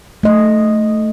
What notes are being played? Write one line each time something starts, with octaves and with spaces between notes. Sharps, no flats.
A3 D#5